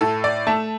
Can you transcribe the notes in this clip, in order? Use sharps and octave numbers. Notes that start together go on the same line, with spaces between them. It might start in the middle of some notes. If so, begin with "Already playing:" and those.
A2 A4
D5
A3 A5